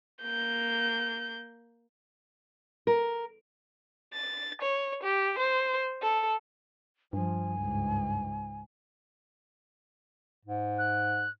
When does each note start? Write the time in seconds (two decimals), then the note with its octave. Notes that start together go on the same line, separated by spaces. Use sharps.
0.22 A#3 G6
2.87 A#4
4.14 A6
4.62 C#5
5.04 G4
5.38 C5
6.02 A4
7.13 G2 F3 G#5
7.57 C#2 G#2
10.45 G#2
10.78 F#6